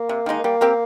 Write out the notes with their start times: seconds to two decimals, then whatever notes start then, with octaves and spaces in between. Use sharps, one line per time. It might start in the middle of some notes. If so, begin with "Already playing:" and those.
Already playing: A#3
0.09 C3
0.26 D#3 G#3 D#4
0.44 G3 A#3
0.61 C4 G4 A#4